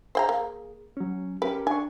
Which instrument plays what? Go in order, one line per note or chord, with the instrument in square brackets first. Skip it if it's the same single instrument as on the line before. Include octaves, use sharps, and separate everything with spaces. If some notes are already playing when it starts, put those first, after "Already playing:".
[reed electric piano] G#4 [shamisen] C5 G5 A#5
[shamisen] A#3
[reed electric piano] F#3 C#4
[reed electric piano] C#4 G4 A#4 [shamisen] B4
[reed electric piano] D4 C#6 [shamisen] G#5